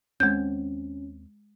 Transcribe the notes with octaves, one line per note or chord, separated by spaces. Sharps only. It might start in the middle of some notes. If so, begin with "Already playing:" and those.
D#2 G#3 C4 C#4 G6